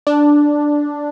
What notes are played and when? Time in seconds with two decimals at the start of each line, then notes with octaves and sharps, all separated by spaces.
0.07 D4